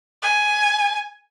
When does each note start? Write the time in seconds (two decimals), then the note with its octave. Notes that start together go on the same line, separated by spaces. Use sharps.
0.22 G#5